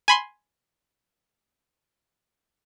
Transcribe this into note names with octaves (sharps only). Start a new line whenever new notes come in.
G#5 B5 C6